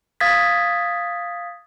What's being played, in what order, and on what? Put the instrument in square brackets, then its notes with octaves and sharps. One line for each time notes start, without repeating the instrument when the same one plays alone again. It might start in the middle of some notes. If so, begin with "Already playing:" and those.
[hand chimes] F5 D#6 G#6 A6 B6